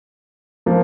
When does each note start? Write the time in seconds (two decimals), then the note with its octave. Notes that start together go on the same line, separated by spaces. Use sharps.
0.66 F3 A#3